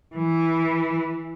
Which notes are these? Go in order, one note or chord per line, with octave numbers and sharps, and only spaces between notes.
E3